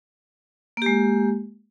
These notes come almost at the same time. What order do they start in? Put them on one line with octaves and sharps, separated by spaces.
A#3 G4 G#3